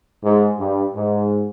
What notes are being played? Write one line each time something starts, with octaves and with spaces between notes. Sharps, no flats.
G#2
G2
G#2